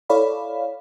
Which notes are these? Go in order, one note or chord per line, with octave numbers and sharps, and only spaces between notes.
E4 A4 C#5 D5 F5 B5